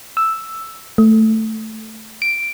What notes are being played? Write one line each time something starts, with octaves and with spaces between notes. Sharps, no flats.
E6
A3
D7